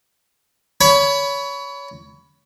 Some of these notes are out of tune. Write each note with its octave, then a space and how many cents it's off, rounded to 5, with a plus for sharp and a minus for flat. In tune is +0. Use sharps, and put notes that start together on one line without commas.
C#5 +25 B5 +0